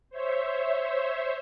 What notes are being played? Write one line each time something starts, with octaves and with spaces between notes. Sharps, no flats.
C5 C#5 E5